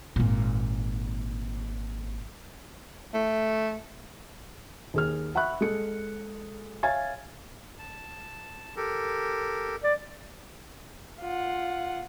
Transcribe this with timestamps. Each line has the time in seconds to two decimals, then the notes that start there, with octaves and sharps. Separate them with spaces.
0.16 G#1 A#2
3.14 A3
4.94 D#2 G#4 F6
5.35 E5 F#5 B5 C#6 F#6
5.61 G#3 A4 C#7
6.83 C#5 E5 F5 G#5 G#6 A6
7.79 A5
8.76 G4 A4 A#4
9.83 D5
11.21 F4 F#5